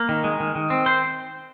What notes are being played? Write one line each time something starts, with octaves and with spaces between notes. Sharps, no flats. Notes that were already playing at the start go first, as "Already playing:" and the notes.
Already playing: A#3
D#3
G#3
D#3
D#3
C4
C5